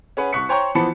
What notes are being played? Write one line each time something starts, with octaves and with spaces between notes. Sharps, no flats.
C#4 G#4 B4 F#5
C2 C#6 F#6 B6 C#7
C5 C#5 G5 A#5 C6 C#6
E3 F3 B3 A5 B5 C#7